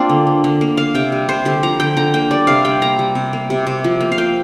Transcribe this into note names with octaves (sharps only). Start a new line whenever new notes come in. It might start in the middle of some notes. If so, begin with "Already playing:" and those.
Already playing: A#3 C4 D4 F4
D3
D3
D3
A#3
A#3 F5
C3 G5
G3
C3 C5
D3 G4
F3 A#5
D3 G5
D3 A#5
A#3 G5
G3 D5
C3 F5
G3 G5
A#3 A#5
G3
C3
A#3
C3
C3
F3
A#3
F5
A#3 G5